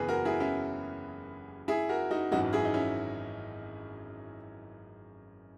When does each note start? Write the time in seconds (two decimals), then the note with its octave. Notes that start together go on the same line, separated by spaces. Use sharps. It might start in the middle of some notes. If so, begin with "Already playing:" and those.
Already playing: F#1 E2 C#3 E3 G#4 B4
0.09 F#4 A#4
0.25 E4 G#4
0.40 C#4 E4
1.68 E4 G#4
1.89 F#4 A#4
2.11 D#4 F#4
2.31 G#1 F#2 E3 D#4 F#4
2.53 E4 G#4
2.65 D#4
2.74 C#4 E4